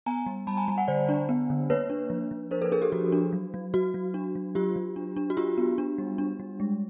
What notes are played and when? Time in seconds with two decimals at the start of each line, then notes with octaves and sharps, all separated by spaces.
0.06 B3 G#5 A#5
0.26 G3
0.47 G3 A5 B5
0.57 G#5 A#5
0.68 G3
0.78 F#5 G#5
0.88 D3 C5 D5
1.09 D4
1.29 B3
1.50 D3
1.70 A#3 B4 C#5
1.90 D4
2.10 F3
2.31 F3
2.51 D4 A#4 C5
2.62 A4 B4
2.72 D4 G#4 A#4
2.82 G4 A4
2.92 F3 F#4
3.12 D4
3.33 F#3
3.54 F#3
3.74 F#3 F#4
3.94 F#3
4.14 D4
4.35 F#3
4.55 F#3 F4 G4
4.76 F#3
4.96 D4
5.17 D4
5.30 F#4
5.37 D4 F4 G4
5.58 B3
5.78 D4
5.98 G3
6.18 D4
6.40 G3
6.60 G#3